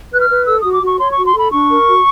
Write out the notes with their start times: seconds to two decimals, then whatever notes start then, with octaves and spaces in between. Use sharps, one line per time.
0.11 B4 F#6
0.20 F6
0.29 B4
0.46 A4 E6
0.59 F#4 D#6
0.72 D6
0.81 F#4 C#6
0.98 C#5 C6
1.12 F#4 C#6
1.25 C6
1.34 A4 B5
1.51 D4 C#6
1.69 A#4
1.87 F#4